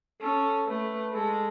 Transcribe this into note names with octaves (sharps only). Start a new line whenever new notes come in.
C#4 A4
A3 B4
G#3 A4